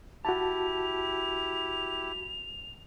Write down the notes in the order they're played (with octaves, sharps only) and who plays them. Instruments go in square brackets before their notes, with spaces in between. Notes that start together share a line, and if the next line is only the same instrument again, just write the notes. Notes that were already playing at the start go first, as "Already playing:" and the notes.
[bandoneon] E4 G4 [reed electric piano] F#4 A5 [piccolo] F7